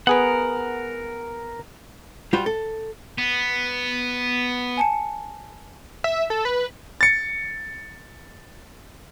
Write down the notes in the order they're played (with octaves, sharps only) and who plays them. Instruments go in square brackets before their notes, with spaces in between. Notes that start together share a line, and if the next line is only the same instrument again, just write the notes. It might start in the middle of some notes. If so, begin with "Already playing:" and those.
[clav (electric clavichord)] B3 G#4 B4 [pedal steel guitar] A#4 F#5
[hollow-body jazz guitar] G3 F4 F#4 C5
A4
[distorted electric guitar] B3
[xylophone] G#5 A5 C#7
[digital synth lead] E5
A4
B4
[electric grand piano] A6 C#7